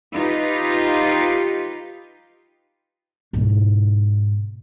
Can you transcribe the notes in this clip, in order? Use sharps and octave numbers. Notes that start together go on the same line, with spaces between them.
D#4 F4 G4 B4
G#2 B2